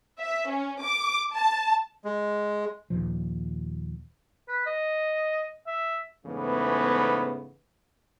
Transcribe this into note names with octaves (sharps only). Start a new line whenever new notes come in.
E5
C#4
D6
A5
G#3
D#2 A#2 F3
B4
D#5
E5
E2 G#2 C#3 E3 A3 B3